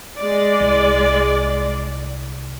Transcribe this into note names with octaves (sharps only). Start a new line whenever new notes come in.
G#3 D5
C2